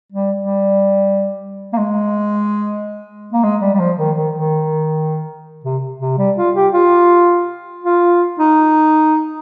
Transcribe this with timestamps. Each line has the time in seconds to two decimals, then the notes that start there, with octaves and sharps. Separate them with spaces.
0.12 G3
0.40 G3
1.73 A#3
1.78 G#3
3.33 A#3
3.43 G#3
3.61 G3
3.74 G3
3.80 F3
3.98 D#3
4.16 D#3
4.35 D#3
5.64 C3
6.00 C3
6.18 G3
6.37 F4
6.55 G4
6.74 F4
7.84 F4
8.39 D#4